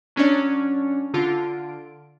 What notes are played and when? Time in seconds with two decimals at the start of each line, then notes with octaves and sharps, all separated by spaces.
0.16 F#3 C#4 D4 C#5 D5
1.14 D3 F4 D7